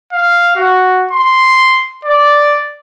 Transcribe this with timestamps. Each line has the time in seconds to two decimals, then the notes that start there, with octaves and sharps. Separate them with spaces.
0.12 F5
0.56 F#4
1.11 C6
2.05 D5